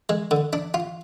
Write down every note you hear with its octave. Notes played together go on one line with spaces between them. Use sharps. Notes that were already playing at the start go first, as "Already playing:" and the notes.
G#3
D3
D4
F4